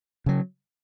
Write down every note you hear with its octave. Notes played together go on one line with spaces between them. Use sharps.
C#3 F#3